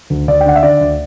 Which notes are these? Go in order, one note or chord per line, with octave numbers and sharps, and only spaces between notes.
D2
D2 D5
G5
D3 F#5
E5
D3 D5
D2